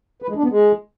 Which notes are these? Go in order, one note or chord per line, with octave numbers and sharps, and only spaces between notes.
B4
G#3
D4
B3
G#3